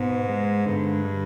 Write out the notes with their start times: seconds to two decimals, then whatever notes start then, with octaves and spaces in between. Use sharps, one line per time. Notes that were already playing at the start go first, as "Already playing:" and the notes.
Already playing: G#2 B2 B3
0.29 G#3
0.66 G2 D3
1.05 G3